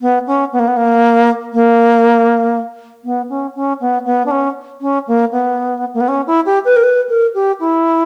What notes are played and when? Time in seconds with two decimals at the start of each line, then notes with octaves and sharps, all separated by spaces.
0.01 B3
0.26 C#4
0.52 B3
0.59 A#3
0.67 B3
0.76 A#3
1.53 A#3
3.04 B3
3.29 C#4
3.55 C#4
3.80 B3
4.05 B3
4.25 D4
4.30 C#4
4.81 C#4
5.07 A#3
5.32 B3
5.94 A#3
6.00 B3
6.08 C#4
6.27 E4
6.45 G4
6.64 B4
6.76 A#4
6.83 B4
7.09 A#4
7.34 G4
7.60 E4